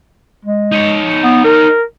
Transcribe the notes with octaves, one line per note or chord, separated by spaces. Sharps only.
G#3
D#4 C#5
B3
A#4